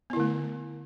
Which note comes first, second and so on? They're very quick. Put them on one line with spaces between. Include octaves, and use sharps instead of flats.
B3 E4 D3 A3